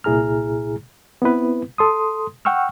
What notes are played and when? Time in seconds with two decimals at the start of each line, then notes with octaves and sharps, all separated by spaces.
0.04 C2 A#2 E4 G#4 A#5 F6
1.22 B3 C4 E4 B4
1.78 A4 C6 D#6
2.45 F#5 G5 C#6 E6 F6